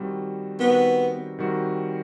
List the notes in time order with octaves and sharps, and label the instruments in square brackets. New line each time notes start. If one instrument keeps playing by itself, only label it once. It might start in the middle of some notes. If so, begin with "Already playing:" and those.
Already playing: [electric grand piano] D#3 G3 C4 F#4
[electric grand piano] D#3 G3 C4 F#4 [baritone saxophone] B3
[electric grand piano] D#3 G3 C4 F#4